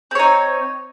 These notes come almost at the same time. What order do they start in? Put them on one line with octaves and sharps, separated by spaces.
C4 C#5 D#4